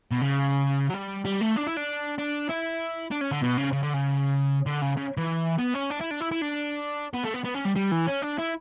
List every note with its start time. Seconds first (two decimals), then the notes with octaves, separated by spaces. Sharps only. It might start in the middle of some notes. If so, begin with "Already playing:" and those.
0.11 B2
0.21 C#3
0.90 F#3
0.94 G3
1.25 G3
1.41 A3
1.56 D4
1.66 E4
1.77 D4
2.18 D4
2.49 E4
3.11 D4
3.21 C#4
3.31 D3
3.42 B2
3.57 C#3
3.73 C#3
3.83 D3
3.94 C#3
4.66 D3
4.81 C#3
4.97 C#3
5.17 E3
5.58 B3
5.74 C#4
5.90 D4
6.00 E4
6.11 D4
6.21 E4
6.32 E4
6.42 D4
7.14 B3
7.24 A3
7.34 B3
7.44 B3
7.55 C#4
7.65 G3
7.76 G3
7.92 E3
8.07 C#4
8.22 D4
8.38 E4